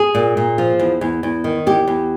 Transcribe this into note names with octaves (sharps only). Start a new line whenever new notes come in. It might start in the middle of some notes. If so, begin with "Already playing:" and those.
Already playing: G#4
A#2
A#2
F3
E2
E2
E2
D#3
E2 G4
E2